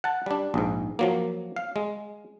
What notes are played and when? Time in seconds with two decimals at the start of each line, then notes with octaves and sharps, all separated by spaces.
0.04 F#5 A5
0.26 G3 D4
0.54 A#1 G#2
0.99 F3 F#3 A#3
1.56 F5
1.76 G#3